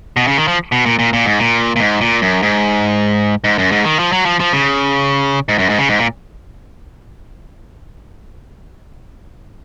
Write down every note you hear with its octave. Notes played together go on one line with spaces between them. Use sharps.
B2
C#3
D#3
F3
B2
A#2
A#2
A#2
G#2
A#2
A#2
G#2
A#2
F#2
G#2
G#2
F#2
G#2
D#3
F3
F#3
F3
F3
C#3
G#2
F#2
G#2
C#3
G#2
A#2